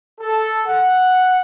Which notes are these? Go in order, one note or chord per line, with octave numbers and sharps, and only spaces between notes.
A4
F#5